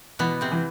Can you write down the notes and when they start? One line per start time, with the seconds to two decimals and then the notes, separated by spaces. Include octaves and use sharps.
0.19 B2 E3 B3
0.41 C3 C4
0.52 E3